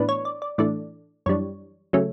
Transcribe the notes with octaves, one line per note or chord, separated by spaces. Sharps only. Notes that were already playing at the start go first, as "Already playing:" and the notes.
Already playing: A2 E3 B3 D4 B4
C#5
D5
D5
A2 E3 A3 D4 D5
F#2 E3 G3 D4 C#5
C#3 F#3 A3 C#4